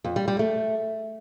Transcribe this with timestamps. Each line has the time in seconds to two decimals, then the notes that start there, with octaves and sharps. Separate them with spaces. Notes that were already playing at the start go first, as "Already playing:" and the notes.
0.04 F2
0.16 G3
0.28 G3
0.39 A3